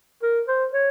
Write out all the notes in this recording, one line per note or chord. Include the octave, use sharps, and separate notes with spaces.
A#4
C5
C#5